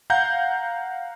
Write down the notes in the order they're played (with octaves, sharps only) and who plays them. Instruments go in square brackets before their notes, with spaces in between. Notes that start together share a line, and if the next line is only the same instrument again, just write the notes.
[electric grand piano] F5 F#5 A#5 G6